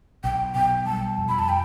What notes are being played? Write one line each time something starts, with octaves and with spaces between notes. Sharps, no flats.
B1 G5
B2 G5
G3 A5
F2
B5
A5
G5